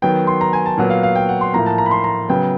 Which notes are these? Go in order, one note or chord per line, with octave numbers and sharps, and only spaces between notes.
D#3 F#3 B3 G5
C6
A#5
G#5
A5
A#2 F#3 B3 F#5
F5
F5
G5
F#5
C6
A2 F3 A#3 A#5
A5
A#5
B5
C6
A#5
C#3 F#3 B3 G5